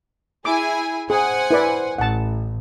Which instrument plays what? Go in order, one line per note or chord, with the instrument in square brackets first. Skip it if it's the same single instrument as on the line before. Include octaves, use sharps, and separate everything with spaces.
[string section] E4 G#4 G#5 [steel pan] D6
[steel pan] G#4 [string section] C5 F#5 G#5
[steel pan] E4 B4 D5
[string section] A1 [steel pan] F#5 A5